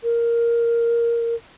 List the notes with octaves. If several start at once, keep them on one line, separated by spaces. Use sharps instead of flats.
A#4